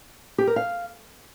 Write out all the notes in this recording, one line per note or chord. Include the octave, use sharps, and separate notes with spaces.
G4
A#4
F5